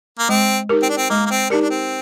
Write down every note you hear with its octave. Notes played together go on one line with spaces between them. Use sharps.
A#3
G#3 C4
D#4 G4 A#4
C4
D4
C4
G#3 A#3
A#3
C4
D4 D#4 G4 A#4
D4
C4